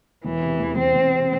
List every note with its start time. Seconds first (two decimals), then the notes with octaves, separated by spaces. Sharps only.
0.24 E1 E3
0.42 C3
0.60 E2
0.77 E1 C4
0.95 E1
1.13 C3